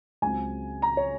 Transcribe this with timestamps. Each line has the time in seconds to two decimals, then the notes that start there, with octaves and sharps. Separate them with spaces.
0.22 C#2 C#3 F#3 C4 G#5
0.82 A#5
0.97 C#5